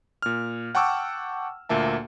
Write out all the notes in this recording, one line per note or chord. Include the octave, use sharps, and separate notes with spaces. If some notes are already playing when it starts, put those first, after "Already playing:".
A#2 F6
F#5 G5 A5 C#6 D6 E6
D2 A#2 A#3 E5 A5